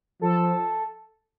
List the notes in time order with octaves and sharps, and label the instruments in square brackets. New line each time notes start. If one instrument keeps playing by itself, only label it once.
[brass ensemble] F3 [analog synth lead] A4